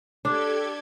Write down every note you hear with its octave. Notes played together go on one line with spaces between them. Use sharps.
D4 G4 A4 G#6